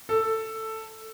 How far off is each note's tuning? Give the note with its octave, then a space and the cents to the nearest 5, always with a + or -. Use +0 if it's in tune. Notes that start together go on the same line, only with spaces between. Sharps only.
A4 +5